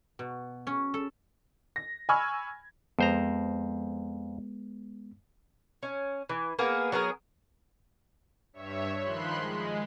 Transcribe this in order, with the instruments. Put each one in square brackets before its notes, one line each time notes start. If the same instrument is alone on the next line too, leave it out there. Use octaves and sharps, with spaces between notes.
[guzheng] B2
C#4
A4
[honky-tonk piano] A#6
G#5 B5 C#6 E6 F6 G#6
[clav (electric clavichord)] F2 C5 A#5 [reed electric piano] G#3 B3
[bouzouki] C#4
E3
A#3 B3 G#4
F#3 B3 G#4 A#4
[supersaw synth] G2 C#5 E5
D#3 F3 B5 C6 F#6
G#3